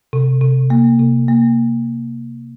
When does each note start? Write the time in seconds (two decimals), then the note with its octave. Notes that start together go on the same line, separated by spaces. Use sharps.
0.13 C3
0.41 C3
0.70 A#3
1.00 C3
1.28 A#3